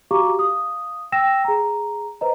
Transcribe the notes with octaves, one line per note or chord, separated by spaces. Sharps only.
F#4 G4 F5 A#5 C#6 D6
F5 D#6
G5 E6 A#6 E7
G#4 A#5
B4 C5 D#5 A#5